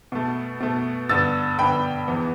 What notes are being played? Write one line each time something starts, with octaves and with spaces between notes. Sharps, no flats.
B2 A3
B2 A3
G2 D3 B3 E6 A6
G2 D3 B3 G5 B5
E2 E3 B3